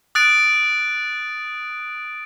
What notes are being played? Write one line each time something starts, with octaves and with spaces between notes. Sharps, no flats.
D#6 F#6 A6 D7